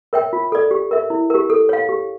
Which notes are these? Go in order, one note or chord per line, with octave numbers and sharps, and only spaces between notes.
A#4 C#5 E5 G5
F4
A4 D5
G4
A#4 E5
E4
G4 A#4
A4
C#5 F5
G4